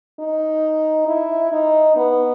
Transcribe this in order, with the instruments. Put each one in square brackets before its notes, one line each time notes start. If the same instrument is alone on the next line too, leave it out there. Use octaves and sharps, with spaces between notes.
[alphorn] D#4
E4
D#4
B3